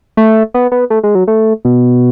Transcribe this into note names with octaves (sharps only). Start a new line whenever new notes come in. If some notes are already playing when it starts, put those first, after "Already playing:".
A3
B3
B3
A3
G#3
F#3
A3
B2